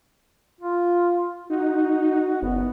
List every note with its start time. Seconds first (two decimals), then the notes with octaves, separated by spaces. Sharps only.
0.61 F4
1.50 D#4 F#4
2.42 F#1 B3